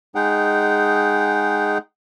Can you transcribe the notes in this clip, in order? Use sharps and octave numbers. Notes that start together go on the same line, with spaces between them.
G#3 D#4 G#4 F#5 G5